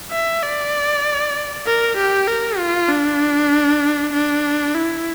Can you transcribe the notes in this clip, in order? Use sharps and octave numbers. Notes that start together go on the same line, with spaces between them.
E5
D5
A#4
G4
A#4
F4
D4
D4
E4